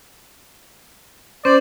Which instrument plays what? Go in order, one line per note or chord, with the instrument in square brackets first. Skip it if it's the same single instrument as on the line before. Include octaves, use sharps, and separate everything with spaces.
[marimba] C#4 [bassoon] C5 [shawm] D5